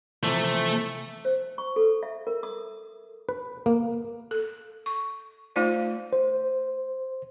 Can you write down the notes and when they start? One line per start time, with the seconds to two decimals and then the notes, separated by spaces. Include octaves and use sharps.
0.23 C3 E3 F3 A3
1.25 C5
1.58 C#6
1.76 A4
2.03 E5
2.27 A#4
2.43 D#6
3.29 B4
3.66 A#3
4.31 A4
4.86 C#6
5.56 A3 D#4 F4 C5 D5 F5
6.13 C5